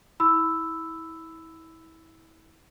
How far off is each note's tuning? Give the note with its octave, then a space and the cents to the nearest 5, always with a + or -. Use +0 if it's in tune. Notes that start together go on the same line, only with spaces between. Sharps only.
E4 -30 B5 +20 E6 +0